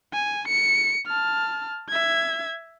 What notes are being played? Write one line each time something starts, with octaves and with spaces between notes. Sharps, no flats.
G#5
C#7
A5 F6
E5 G#6